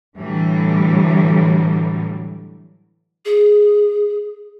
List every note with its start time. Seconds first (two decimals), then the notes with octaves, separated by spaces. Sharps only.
0.16 A2 D3 E3 F#3 G3
3.25 G#4